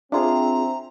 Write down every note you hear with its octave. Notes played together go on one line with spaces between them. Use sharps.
C4 D4 F4 G#4 E5 A#5 C6